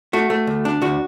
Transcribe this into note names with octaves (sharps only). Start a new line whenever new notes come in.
A3 F#4
A3
D2
D4
D2 F#4